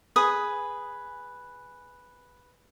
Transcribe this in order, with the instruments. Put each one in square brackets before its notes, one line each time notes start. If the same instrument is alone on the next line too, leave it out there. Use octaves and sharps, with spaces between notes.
[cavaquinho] G#4 B4 D#6